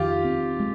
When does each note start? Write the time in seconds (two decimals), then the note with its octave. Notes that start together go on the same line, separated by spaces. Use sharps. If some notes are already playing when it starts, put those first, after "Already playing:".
Already playing: F2 D#3 F4 G4
0.25 C4
0.60 G#3